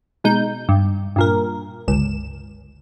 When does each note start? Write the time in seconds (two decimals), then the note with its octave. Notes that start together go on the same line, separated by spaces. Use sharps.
0.24 B2 G#3 D#4 G6
0.69 G2
1.16 G2 A#2 A#4
1.88 G1 C#2 E7